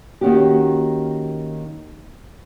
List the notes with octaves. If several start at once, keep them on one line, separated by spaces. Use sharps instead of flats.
D#3 A#3 C#4 F#4 G4